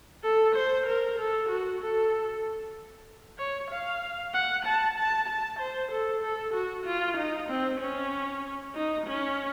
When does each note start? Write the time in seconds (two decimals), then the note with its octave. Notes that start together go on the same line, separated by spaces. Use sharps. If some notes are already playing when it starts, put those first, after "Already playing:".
0.23 A4
0.55 C5
0.87 A#4
1.18 A4
1.49 F#4
1.81 A4
3.39 C#5
3.71 F5
4.34 F#5
4.65 A5
4.97 A5
5.28 A5
5.60 C5
5.92 A4
6.23 A4
6.54 F#4
6.87 F4
7.17 D#4
7.49 C4
7.80 C#4
8.75 D#4
9.07 C#4